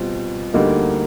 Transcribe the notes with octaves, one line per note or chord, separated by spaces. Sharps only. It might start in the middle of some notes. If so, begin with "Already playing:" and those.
Already playing: B2 G3 C4 F4
D2 D3 G3 A#3 D#4